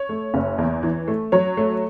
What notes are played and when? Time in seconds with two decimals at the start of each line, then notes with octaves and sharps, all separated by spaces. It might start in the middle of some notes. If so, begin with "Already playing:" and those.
Already playing: C#5
0.09 A3
0.34 F#1
0.58 E2
0.83 E3
1.08 A3
1.32 F#3 C#5
1.57 A3